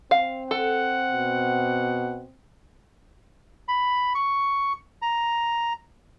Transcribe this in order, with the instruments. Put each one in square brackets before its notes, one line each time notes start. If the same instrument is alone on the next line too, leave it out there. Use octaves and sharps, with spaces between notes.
[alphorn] C4 [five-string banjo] F5
[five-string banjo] A4 [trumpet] F#5
[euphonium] B2
[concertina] B5
C#6
A#5